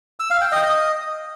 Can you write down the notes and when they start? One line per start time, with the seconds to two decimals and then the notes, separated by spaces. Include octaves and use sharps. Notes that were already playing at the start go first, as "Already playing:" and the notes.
0.20 E6
0.30 F5
0.41 G5
0.52 D#5
0.63 D#5